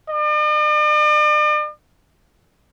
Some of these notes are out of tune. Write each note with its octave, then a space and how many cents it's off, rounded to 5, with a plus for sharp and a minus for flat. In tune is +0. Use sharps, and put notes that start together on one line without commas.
D5 +45